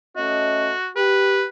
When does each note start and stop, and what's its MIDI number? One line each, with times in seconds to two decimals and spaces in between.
0.17 0.72 57
0.17 0.72 61
0.17 0.89 66
0.17 0.72 75
0.96 1.44 67
0.96 1.46 71